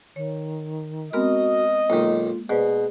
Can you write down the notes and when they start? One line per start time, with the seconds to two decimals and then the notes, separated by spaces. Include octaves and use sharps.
0.16 D#3 C#5
1.13 G#3 B3 C4 F#4 A#4 D#5
1.90 B1 D#3 G#3 A#3 F4
2.49 B2 G#4 B4 C5 D5